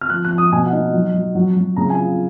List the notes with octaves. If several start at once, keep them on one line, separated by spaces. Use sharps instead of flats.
F6
F3 F#6
F#6
F3
D#6
B2 G#5
F#5
D#4
F#3
F#3
F#3
F#3
C#3 A#5
G#5
F4